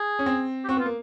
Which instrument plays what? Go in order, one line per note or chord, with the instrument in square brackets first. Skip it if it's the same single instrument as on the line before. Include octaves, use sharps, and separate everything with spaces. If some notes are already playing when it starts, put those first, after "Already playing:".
Already playing: [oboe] G#4
[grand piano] C#4
C4
[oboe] G4
[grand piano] C4 [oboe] F#4
[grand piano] B3 [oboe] F4
[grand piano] A#3